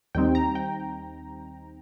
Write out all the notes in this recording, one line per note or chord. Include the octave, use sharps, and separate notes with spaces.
D#2 D#3 G3 C4 D#4 G5
A#5
G5